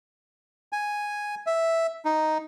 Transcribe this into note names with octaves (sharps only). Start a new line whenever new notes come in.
G#5
E5
D#4